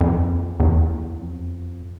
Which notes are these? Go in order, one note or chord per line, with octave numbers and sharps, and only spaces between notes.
F2
E2
F2